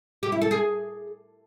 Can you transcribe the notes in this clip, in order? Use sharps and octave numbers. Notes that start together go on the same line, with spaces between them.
G4
E4
A4
G#4